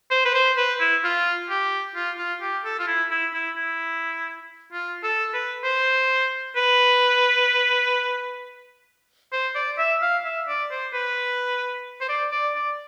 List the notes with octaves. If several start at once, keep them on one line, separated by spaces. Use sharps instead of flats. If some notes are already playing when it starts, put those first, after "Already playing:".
C5
B4
C5
B4
E4
F4
G4
F4
F4
G4
A4
F4
E4
E4
E4
E4
F4
A4
B4
C5
B4
C5
D5
E5
F5
E5
D5
C5
B4
C5
D5
D5
D5